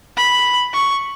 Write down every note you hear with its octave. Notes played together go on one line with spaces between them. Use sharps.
B5
C#6